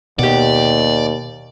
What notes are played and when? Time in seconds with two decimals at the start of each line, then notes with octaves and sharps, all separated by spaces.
0.19 D#2 B2 G4 D5 F#5